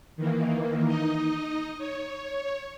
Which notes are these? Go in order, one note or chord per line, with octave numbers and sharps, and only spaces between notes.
D#3 E3 A#3
D#4 D#5
C#5